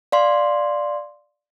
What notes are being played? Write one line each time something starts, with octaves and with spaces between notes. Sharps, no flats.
D5 F5 C6